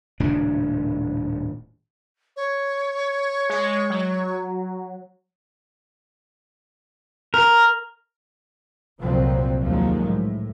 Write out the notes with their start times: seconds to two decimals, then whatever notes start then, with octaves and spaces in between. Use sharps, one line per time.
0.20 D#1 A2 C#3 D4
2.36 C#5
3.49 G#3
3.90 F#3
7.34 A#4
9.00 C2 F2 A#2 F3 F#3 C4
9.66 D#2 D#3 F3 F#3 G#3
10.04 A2